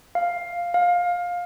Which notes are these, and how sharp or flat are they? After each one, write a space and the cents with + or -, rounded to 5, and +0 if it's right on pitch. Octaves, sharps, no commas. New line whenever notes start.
F5 +0
F5 +15